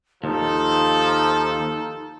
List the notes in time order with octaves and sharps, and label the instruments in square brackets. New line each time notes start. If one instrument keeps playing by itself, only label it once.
[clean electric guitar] D#2 [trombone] F3 [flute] D#4 [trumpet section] A4